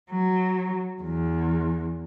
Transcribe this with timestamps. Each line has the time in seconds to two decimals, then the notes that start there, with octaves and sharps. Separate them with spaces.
0.10 F#3
1.02 E2